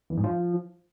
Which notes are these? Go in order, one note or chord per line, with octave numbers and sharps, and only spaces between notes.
E2
G#2
F3